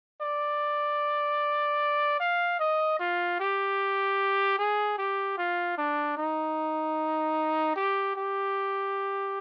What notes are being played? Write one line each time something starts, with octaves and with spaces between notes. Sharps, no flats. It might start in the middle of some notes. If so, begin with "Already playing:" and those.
D5
F5
D#5
F4
G4
G#4
G4
F4
D4
D#4
G4
G4